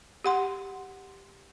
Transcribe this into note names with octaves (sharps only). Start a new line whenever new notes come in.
G4 F#5 C6